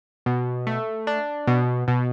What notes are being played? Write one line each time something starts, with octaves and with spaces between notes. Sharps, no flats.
B2
A3
D4
B2
B2